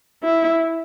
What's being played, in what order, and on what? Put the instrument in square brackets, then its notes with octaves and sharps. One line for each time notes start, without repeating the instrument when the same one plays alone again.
[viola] E4